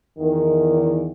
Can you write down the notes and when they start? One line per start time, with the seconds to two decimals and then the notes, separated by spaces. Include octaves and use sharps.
0.18 E2 D#3